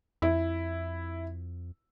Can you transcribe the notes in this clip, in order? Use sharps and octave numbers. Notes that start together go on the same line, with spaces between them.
F2 E4